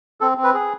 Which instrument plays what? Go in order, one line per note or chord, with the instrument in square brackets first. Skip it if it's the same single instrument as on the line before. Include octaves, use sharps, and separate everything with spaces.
[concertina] C4 A4
C4
B4
G#4